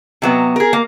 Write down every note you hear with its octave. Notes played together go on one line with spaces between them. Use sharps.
C3 F#3 B3
G#4 A#4
A#3